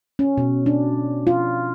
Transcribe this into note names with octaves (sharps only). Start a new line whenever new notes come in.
C#4
B2
D4
F4